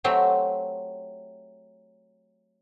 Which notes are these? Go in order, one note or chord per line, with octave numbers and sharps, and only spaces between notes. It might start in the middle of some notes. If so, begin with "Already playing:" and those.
F#3 A3 C4 G4 C5